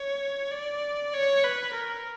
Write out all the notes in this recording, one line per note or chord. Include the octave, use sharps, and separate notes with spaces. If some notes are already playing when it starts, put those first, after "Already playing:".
Already playing: C#5
D5
C#5
B4
A#4